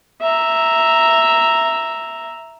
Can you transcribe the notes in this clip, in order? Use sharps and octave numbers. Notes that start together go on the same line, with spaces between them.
E5 A#5